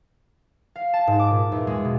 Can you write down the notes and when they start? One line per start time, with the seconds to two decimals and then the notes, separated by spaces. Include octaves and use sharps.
0.76 F5
0.93 A5
1.07 G#2
1.19 D6
1.31 A#2
1.52 E2
1.67 G#3
1.85 B2